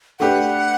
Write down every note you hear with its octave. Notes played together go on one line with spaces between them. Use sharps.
A3 D4 G4 B4 F#5